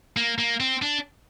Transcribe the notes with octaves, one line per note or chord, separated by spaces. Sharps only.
A#3
A#3
C4
D4